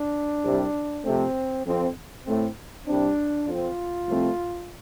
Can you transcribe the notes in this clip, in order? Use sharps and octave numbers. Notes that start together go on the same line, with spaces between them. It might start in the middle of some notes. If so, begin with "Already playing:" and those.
Already playing: D4
C2 C3 G3
F2 C3 A3 C4
F2 F3 C4
A2 A3 C4
C2 C3 G3 C4 D4
F2 F3 C4 F4
C2 C3 F3 A3 C4